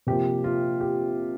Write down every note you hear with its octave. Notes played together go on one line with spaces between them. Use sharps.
C3 F3 A#3 G4
F4
G4